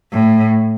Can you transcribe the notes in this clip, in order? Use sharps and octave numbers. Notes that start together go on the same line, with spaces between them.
A2